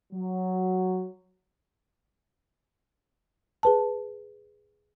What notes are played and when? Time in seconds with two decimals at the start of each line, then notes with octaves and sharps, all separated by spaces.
0.12 F#3
3.63 G#4 B4 A5